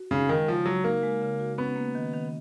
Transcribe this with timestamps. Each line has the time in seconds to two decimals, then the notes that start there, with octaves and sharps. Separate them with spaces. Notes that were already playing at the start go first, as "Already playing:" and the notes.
Already playing: F#4
0.11 C#3 D#4
0.29 D#3 G#3
0.48 C#3 F3
0.66 F#3 F#4
0.84 A#3 D#4
1.03 G#3
1.21 C#3
1.40 F#4
1.58 B3 C#4
1.76 A#3
1.95 D#3
2.14 D#3